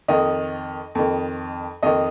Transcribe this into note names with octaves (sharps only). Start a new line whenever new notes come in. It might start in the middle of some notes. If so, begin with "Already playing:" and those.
F2 D#3 D#5
F2 D#3
F2 D#3 D#5